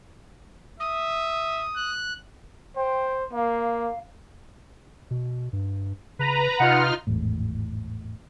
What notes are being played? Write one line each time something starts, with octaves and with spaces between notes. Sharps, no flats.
E5 D#6
F#6
C5 G5
A#3 F5
B2
G2
C#3 B4 A#5
C3 D#4 F4 F#5 F6
G#1 E2 A2